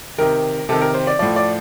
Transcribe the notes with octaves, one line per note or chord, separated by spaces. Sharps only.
C3 D#3 A#4
C3 D#3 A4
A#4
C5
D5
A2 F3 D5
D5